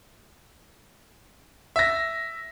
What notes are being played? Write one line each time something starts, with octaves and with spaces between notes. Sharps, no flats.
E5 A#6